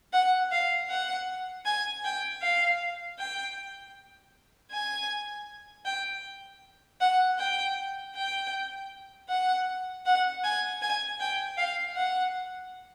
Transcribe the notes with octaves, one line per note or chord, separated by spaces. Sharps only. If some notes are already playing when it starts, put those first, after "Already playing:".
F#5
F5
F#5
G#5
G5
F5
G5
G#5
G5
F#5
G5
G5
F#5
F#5
G#5
G#5
G5
F5
F#5